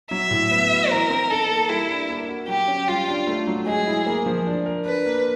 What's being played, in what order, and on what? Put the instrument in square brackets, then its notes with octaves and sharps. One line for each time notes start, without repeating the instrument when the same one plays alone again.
[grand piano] F#3 [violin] E5
[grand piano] A2
B3
F#4
[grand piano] E3 [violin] A#4
[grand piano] C4
[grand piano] D#4 [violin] A4
[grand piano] A#3
[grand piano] G3 [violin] E4
[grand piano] D4
A#3
F#4
[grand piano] F#3 [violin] G4
[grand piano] C#4
[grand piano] G3 [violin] F4
[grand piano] D4
A3
F#3
[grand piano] G#3 [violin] G#4
[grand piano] E4
A#3
F3
D4
A#4
[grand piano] D4 [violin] B4
[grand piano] A#3